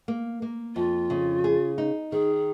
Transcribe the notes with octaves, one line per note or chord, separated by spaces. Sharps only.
A#3
A#3
F2 F4
C#3
G#4
D#4
D#3 G#4